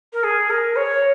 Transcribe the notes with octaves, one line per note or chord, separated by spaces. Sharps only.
A#4
G#4
A#4
C#5